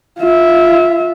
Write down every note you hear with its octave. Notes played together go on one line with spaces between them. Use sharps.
F4 E5